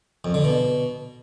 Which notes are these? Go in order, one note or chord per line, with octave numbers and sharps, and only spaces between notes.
F2
D3
B2